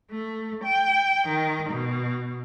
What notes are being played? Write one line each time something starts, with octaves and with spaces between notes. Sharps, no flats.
A3
G5
D#3
B2